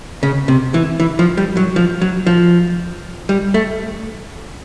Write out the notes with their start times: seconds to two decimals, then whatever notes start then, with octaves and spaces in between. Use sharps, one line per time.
0.23 C#3
0.48 C3
0.74 E3
1.00 E3
1.19 F3
1.37 G3
1.57 F#3
1.76 F3
2.01 F#3
2.26 F3
3.29 G3
3.54 A3